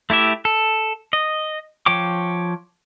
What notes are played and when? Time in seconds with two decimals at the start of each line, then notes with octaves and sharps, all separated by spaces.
0.10 A3 E4 G4 E5
0.45 A4
1.13 D#5
1.86 F3 C#5 G5 D6